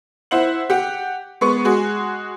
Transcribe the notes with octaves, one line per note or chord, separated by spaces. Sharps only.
E4 C5 F#5 F#7
G4 F#5
G#3 B3 C#6
G#3 F#4 G#4